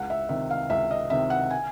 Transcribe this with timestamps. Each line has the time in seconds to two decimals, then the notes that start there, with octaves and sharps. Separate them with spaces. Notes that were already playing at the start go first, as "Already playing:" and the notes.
Already playing: C#2 F#5
0.10 E5
0.29 C3 D#3 E5
0.51 F5
0.70 C#2 E5
0.91 D#5
1.10 C3 D#3 E5
1.30 F#5
1.50 G#5